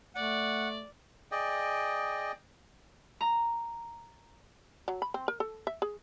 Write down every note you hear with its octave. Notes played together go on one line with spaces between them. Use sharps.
A3 D5 F#5
G#4 D5 D#5 G5
A#5
F#3
B5
C4
A#4
A4
E5
G#4